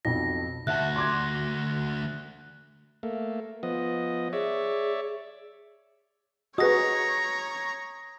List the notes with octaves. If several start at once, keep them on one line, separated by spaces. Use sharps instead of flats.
B1 F2 A#6
D2 F#4 E5 F#5 A5 F#6
C6 D6 G#6
A3 A#3
F3 B3 D#5
G#4 C#5 D5 E5
F#4 G#4 B4 C#5 D#5 A#5 D#6 A#6